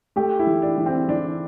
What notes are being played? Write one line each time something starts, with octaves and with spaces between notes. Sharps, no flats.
A3 G4
E4
E3
D4
E3
C4
E3 D4